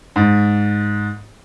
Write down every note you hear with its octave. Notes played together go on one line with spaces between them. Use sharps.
G#2